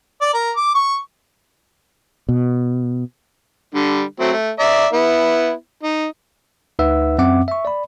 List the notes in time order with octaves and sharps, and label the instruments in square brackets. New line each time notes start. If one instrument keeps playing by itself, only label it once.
[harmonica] D5
A#4
D6
C#6
[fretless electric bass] B2
[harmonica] D3 G3
F#3 A3 C4
A3
D5 E5 A#5
B3 E4
D#4
[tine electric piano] D2 D#4 B4 E5 F#5 E6
F#2 C4 E5 F#5 D6
E5 C#6
D5 B5